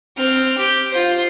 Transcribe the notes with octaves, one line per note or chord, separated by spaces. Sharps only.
C4 F6
G4
F4 C5